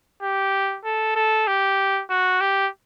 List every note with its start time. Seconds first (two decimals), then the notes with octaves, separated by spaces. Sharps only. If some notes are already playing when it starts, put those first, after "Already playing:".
0.23 G4
0.85 A4
1.16 A4
1.47 G4
2.10 F#4
2.41 G4